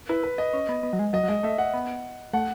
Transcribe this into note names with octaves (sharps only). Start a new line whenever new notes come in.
E4 B4
B4
D#5
C#4
B3
B3
F#3
G#3
F#3 D#5
F#3
G#3 D#5
A3 E5
F#5
B3
A3 F#5